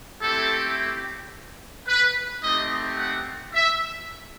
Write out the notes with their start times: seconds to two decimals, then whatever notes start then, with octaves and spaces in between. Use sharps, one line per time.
0.22 A3 C4 E4 G4 A4
1.88 B4
2.43 A3 C4 D#4 G4 D#5
2.99 F#5
3.54 E5